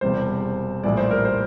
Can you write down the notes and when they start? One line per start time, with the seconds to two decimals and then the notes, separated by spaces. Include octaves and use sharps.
0.01 E1 E2 C3 G3 C5
0.83 A#1 A2 E3 G3 D5
0.97 C5
1.11 A#4
1.25 C5